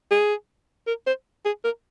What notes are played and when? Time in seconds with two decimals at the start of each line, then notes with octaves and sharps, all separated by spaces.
0.11 G#4
0.87 A#4
1.07 C5
1.45 G#4
1.64 A#4